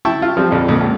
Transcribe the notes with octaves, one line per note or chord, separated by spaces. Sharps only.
E4 G5 A5 C#6
F4
F3 G3 C4
A#1 F2
F2 A#2
C#2